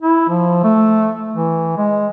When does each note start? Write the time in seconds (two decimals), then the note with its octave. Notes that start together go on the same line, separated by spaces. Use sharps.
0.02 E4
0.28 F3
0.64 A3
1.33 E3
1.77 G#3